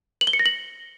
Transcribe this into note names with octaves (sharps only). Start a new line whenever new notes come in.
F#7
G7
C#7
A#6
F#7